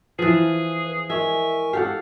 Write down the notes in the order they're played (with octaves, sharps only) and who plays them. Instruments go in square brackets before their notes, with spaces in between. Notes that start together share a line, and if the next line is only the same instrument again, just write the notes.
[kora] E3 F3 [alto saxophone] G#4 [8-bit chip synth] B4
[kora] G#3 [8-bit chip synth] A#4 G#5 C#6 [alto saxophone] E5
[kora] G4 A4 F#5 [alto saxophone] F5